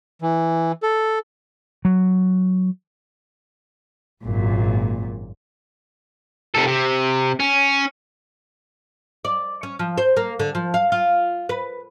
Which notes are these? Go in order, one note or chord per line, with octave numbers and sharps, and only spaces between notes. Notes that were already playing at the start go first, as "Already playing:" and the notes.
E3
A4
F#3
G#1 F#2 A#2
C3 A4
C3
C#4
D5
C#4
F3
C5
A#3
D3
F3
F5
F4
B4